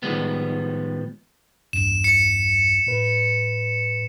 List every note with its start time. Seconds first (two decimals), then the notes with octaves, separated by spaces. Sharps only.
0.03 A2 D#3 F3 G3 G#3 B3
1.73 B1 E2 G2 E7
2.04 C#7
2.87 A2 B4